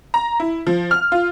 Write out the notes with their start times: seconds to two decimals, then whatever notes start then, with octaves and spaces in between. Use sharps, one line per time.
0.14 A#5
0.40 E4
0.67 F3
0.91 F6
1.12 F4